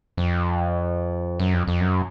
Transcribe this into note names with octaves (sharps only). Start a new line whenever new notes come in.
F2
F#2
F2
F2
F#2